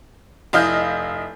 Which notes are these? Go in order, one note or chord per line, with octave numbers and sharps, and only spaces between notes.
F1 E4 D#5 F5 F6 G6